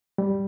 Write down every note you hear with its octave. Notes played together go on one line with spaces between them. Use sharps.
G3